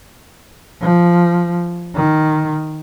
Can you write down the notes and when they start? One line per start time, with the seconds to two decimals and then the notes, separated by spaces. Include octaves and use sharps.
0.82 F3
1.95 D#3